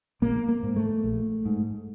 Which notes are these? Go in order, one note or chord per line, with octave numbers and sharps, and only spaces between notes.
A#1 A#3
A#3
G#2
A3
A#1
G#2